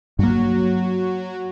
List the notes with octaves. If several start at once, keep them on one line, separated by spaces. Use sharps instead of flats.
G2 F#3 A#3 F#4